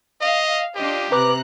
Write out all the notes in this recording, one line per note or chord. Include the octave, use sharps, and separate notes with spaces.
D#5 F5
D4 F4 G4 D#5
C3 B4 A#5 D6 F#6